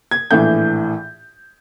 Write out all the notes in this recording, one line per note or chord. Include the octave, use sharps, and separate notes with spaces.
G#6
A#1 A2 E3 G6